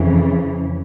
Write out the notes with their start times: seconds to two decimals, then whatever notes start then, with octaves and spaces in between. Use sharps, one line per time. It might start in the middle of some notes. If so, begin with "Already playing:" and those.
Already playing: F2 C#3 E3